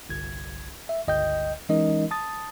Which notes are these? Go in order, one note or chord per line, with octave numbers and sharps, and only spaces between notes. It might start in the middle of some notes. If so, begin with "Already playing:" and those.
G1 C2 G#6
E5
G1 C#2 D#5 G5 G6
E3 G#3 C#4 D#4 A#4 D#5
A5 D#6 A6